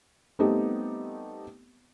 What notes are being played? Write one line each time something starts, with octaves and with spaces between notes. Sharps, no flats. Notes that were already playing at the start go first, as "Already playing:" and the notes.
G3 A3 B3 C4 D#4 G4